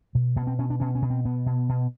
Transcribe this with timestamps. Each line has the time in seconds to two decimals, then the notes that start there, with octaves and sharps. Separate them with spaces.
0.15 B2
0.36 B2 B3
0.47 C4
0.59 B2 C#4
0.70 D4
0.80 B2 C#4
0.95 C#4
1.02 B2
1.10 C4
1.25 B2 B3
1.46 B2
1.69 B2